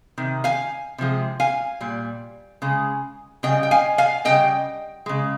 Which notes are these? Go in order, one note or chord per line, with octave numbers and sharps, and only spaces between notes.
C3 D#3
F5 G#5
C3 F3 G#3
F5 G#5
A#2 G3
C#3 G#3
C#3 G3 D#5 G5
G5
F5 G#5
F5 G#5
C#3 G3 D#5 G5
C#3 G#3